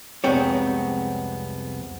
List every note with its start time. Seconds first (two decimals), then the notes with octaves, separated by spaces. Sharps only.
0.24 C2 F2 G#3 B3 C4 C#5